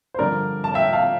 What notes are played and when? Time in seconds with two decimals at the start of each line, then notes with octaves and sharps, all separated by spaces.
0.14 C5
0.19 G2 D3 F3 A#4 D5
0.64 A5
0.74 E5 G5
0.93 F5 A5